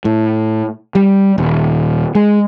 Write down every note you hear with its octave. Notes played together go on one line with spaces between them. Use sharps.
A2
G3
D#1
G#3